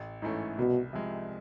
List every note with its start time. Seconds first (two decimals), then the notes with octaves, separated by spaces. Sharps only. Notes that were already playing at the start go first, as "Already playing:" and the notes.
Already playing: A1
0.22 G#2 E3 A3 C#4
0.58 C2 B2
0.93 C3 F3 G#3